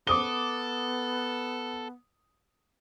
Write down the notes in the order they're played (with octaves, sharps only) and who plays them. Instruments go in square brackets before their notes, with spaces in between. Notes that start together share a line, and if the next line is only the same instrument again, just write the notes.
[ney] B3 [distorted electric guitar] A4 [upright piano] D6 D#6 G7